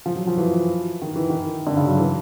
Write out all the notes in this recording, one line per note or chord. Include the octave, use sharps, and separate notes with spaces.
F3
F#3
F3
E3
D#3
E3
D#3
D3
C#3
F#3
E3